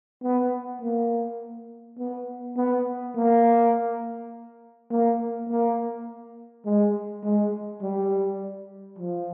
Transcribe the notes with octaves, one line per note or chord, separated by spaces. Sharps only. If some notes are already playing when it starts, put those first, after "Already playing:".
B3
A#3
B3
B3
A#3
A#3
A#3
G#3
G#3
G3
F3